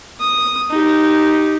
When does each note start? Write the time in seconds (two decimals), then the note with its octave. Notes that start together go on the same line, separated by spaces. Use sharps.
0.20 D#6
0.70 D#4 G4